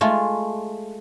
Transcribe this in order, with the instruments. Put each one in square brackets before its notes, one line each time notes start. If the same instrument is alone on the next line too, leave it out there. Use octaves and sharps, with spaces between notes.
[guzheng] G#3 A3 F4